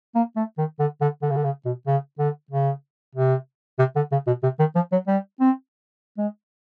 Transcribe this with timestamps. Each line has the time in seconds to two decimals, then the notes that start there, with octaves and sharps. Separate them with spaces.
0.15 A#3
0.36 A3
0.58 D#3
0.79 D3
1.01 D3
1.22 D3
1.30 C#3
1.36 D3
1.44 C#3
1.65 B2
1.87 C#3
2.19 D3
2.50 C#3
3.15 C3
3.79 C3
3.96 D3
4.12 C#3
4.27 B2
4.43 C3
4.59 D#3
4.75 F3
4.92 F#3
5.07 G3
5.40 C4
6.18 G#3